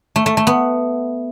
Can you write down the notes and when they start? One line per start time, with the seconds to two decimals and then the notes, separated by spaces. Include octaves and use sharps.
0.16 A3
0.26 A3
0.37 A3
0.47 B3